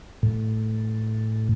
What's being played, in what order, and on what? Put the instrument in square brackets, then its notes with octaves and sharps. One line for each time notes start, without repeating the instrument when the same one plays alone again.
[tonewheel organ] A2